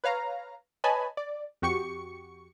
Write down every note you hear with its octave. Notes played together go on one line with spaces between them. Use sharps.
B4 C#5 F5 A#5
B4 C#5 D#5 G#5 A5 B5
D5
F2 F#4 G4 C#6 C#7